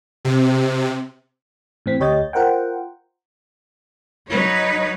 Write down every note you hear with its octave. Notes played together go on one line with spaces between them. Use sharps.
C3
A2 E3 C4 B6
D2 G4 C#5 D#5 G6 A6
F4 A#4 C5 F#5 G5
F#3 D#4 B4 C#5